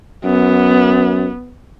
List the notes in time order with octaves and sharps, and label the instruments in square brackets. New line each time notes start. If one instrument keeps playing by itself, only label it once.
[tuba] F#2 [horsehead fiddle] B3